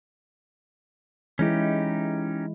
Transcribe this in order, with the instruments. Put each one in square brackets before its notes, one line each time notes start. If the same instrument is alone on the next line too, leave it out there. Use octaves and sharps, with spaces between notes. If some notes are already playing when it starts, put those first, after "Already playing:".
[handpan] E3 G#3 E4 [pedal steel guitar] C#4 D#4 G4